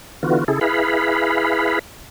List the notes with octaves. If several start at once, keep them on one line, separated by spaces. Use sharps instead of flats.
D3 E3 B3 F4 F#4
C#3 E4 G#4 A4
E4 G#4 B4 F5 B5